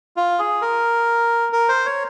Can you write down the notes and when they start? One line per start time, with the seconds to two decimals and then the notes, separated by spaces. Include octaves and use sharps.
0.17 F4
0.39 G#4
0.62 A#4
1.52 A#4
1.69 C5
1.86 C#5